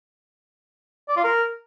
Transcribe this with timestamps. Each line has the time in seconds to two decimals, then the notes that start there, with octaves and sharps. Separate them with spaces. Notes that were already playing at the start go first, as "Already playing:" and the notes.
1.09 D5
1.17 F4
1.24 A#4